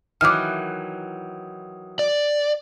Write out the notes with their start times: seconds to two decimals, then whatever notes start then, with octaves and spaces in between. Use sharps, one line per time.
0.21 D#3 E3 F#3 D6 F6
1.99 D5